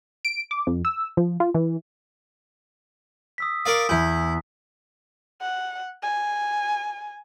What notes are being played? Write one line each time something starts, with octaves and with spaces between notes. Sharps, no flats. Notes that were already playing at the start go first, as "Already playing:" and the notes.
D7
D6
F2
E6
F3
F4
E3
D#6 E6 B6
A#4 D5 F5 D#6
E2 E4 G#5 B5 G6 B6
F#5
G#5